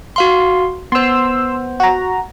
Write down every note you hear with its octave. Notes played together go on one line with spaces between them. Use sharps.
F#4 F5 C6
B3 C5 C6 E6
F#4 A#5